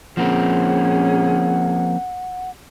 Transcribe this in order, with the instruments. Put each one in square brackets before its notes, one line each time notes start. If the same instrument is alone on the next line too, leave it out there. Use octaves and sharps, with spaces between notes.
[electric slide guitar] F3 A#3 C4 [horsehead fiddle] C#4 G#4 [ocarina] F#5